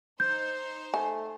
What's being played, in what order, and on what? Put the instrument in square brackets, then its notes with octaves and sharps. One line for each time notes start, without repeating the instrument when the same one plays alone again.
[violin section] D#4 C5 [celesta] G6
[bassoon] A3 [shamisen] G#5